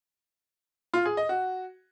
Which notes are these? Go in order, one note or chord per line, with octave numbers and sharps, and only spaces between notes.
F4
G#4
D#5
F#4